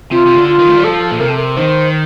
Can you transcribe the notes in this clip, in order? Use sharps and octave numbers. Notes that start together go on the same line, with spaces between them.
C3 F4
C3
D3
F4
D#3
A3
G3
F3 A4
A#2
C3 A#4
A4
A#4
D#3 C5